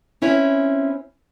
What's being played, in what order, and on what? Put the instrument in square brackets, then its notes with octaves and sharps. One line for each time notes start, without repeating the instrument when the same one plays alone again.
[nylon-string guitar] C4 C#4 E4 B4 C#5